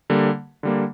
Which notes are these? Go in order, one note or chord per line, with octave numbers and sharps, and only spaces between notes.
D3 G3 A#3
D3 G3 A#3